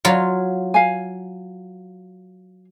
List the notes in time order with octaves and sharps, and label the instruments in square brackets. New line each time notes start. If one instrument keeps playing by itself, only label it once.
[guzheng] F#3 F4
[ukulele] F5 G#5